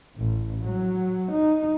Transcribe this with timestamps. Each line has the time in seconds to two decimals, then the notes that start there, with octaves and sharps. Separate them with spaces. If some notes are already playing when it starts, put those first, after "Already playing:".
0.17 A1
0.64 F#3
1.32 D#4